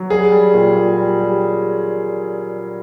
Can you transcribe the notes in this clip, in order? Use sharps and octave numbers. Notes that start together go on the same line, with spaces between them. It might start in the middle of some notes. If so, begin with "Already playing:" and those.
Already playing: F#3
G3 G#4
G3
A#2
A#2
G3
G3